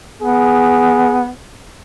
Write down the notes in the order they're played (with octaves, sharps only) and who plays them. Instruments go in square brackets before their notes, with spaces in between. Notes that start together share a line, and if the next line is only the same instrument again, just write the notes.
[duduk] B3 [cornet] G#4